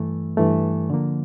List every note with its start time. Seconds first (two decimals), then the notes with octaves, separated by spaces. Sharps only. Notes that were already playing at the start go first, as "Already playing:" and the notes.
Already playing: G2 E3 A3
0.37 G2 E3 A3
0.90 D3 F3 A#3